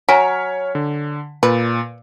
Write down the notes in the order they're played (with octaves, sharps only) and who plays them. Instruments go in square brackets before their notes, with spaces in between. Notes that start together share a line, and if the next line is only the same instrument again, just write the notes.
[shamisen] F#3 [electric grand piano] C#5 F6 B6 [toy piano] G#5 A#5
[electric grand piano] D3
[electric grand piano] A#2 [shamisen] B4